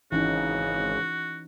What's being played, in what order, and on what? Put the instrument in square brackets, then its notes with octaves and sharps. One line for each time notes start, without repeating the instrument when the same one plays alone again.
[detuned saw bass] G#1 [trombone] C#3 [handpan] E3 C#4 D#4 [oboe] F#4